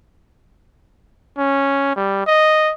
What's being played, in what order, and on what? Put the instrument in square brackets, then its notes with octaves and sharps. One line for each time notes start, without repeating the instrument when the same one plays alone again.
[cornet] C#4
G3
D#5